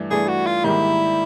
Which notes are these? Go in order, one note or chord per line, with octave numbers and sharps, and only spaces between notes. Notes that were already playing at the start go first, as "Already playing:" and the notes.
Already playing: G2 E3 A3 D4
G2 E3 A3 D4 G#4
F#4
F4
G#2 D#3 G3 A#3 E4